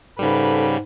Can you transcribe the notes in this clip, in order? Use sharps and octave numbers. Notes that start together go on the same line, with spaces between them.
G#2 C#3 G3 A4 B4